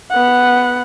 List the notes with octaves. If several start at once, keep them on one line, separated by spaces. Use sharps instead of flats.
B3 F#5